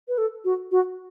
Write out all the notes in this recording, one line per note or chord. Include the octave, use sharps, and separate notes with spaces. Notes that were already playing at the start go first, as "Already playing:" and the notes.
B4
A4
F#4
F#4